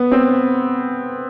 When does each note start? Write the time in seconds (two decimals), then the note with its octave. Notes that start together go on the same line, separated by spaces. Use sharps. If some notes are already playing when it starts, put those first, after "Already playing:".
Already playing: B3
0.12 C4